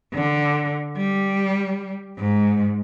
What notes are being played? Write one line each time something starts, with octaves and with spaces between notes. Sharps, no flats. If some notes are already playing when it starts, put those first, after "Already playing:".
D3
G3
G#2